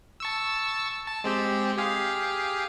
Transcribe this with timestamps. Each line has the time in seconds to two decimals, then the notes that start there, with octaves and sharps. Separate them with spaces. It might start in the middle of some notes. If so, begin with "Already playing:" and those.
0.20 A5 C#6 E6
1.07 A5
1.24 G#3 C4 G4
1.78 G4 G#4 F5